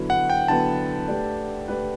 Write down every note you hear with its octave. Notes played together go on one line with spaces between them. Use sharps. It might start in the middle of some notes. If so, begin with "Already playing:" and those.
Already playing: D3 F#3 B3 E4
F#5
G5
D3 F#3 B3 E4 A5
A3 D4 G4 B4
A3 D4 G4 B4